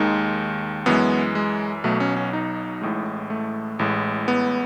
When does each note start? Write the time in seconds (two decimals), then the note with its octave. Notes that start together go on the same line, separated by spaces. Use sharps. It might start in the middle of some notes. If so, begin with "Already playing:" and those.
Already playing: D#2 D#3 G#3 D#4
0.86 F#2 E3 G#3 B3
1.35 G#3
1.84 B1 B2 F#3 A3
2.00 C#4
2.16 C#4
2.33 D#4
2.82 A1 A2 G#3
3.30 A3
3.79 A1 A2 G#3
4.28 B3